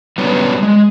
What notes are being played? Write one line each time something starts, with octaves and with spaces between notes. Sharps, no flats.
F#3 G3 B3 C#4 D4 B4
G#3